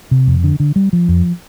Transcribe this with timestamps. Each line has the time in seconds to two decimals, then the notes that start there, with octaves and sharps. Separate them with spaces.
0.11 C3
0.27 F2
0.44 D3
0.60 D3
0.76 G3
0.93 F3
1.08 F2